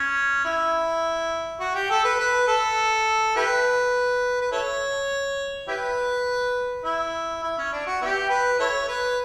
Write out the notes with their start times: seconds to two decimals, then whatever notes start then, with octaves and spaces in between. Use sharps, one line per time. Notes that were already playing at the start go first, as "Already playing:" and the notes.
Already playing: C#4
0.45 E4
1.60 F#4
1.75 G4
1.90 A4
2.04 B4
2.19 B4
2.48 A4
3.36 E4 G4 B4
4.41 B4
4.52 E4 A4 C#5
5.68 E4 G4 B4
6.85 E4
7.43 E4
7.58 C#4
7.72 D4
7.87 F#4
8.02 B3 E4 G4
8.30 B4
8.60 E4 A4 C#5
8.88 B4